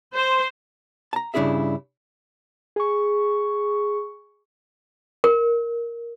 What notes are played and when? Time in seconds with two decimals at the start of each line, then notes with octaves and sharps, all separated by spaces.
0.15 C5
1.13 A5 A#5
1.34 G2 C#3 D4 E4 G#4 E5
2.76 G#4 C#6
5.24 A#4